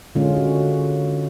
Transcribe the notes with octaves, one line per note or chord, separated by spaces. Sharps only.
D3 G#3 C#4 F4
F#4